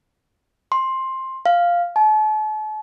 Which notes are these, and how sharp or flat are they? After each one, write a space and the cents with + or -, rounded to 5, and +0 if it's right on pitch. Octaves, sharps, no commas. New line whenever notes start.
C6 +15
F5 -5
A5 -40